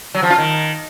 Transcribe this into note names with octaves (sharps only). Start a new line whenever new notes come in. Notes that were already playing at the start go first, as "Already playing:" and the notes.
F#3
F3
F4
D#3